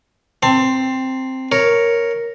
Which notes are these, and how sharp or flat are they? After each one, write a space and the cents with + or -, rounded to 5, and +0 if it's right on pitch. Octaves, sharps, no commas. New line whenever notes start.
C4 +0 A5 +30 C6 +0
A#4 +0 C#5 +0